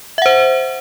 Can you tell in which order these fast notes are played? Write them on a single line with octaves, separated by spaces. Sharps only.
E5 F#5 C5